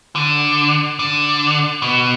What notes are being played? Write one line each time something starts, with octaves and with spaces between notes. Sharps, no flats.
D3
D3
B2